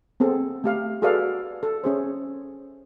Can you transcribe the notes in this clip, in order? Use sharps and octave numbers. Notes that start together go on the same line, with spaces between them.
B3 C4 G#4 A4
A3 G4 F5
F#4 G#4 A4 B4 D5 F5
A4
C#4 G#4 C5